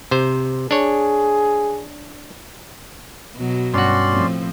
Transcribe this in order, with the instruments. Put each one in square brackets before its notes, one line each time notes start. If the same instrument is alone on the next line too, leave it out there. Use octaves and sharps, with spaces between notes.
[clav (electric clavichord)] C3 C5
[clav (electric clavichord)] D4 C#5 [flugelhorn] G#4
[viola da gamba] B2 F#3
[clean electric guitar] G2 F#4 [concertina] C#4 D5 C6
[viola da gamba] A2 F3 C4